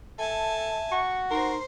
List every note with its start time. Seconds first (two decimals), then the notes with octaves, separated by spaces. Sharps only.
0.19 A4 E5 G#5 A5
0.92 F#4 C#6
1.31 D#4 A#4 C5 C6